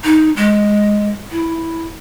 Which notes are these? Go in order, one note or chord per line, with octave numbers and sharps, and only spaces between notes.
D#4
G#3
E4